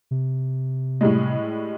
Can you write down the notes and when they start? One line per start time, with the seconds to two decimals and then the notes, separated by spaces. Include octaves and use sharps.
0.11 C3
1.01 A2 G3 G#3